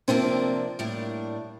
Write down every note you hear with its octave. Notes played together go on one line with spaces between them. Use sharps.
C3 F3 A#3 C4 D4
A2 G3 A#3 D4